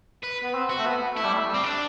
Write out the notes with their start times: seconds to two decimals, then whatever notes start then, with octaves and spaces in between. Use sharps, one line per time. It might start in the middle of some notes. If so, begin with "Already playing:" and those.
0.23 B4
0.43 B3
0.55 C4
0.70 F#4
0.79 A3
0.86 B3
1.16 A3 E4
1.24 G3
1.33 A3
1.48 G3
1.55 C4
1.64 D4